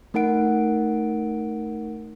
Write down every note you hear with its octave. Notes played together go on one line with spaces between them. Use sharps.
A3 D#4 A#4 F#5 D7